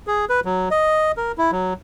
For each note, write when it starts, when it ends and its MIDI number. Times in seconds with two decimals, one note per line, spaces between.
0.07 0.25 68
0.29 0.40 71
0.45 0.69 54
0.71 1.12 75
1.17 1.32 70
1.38 1.51 64
1.52 1.74 54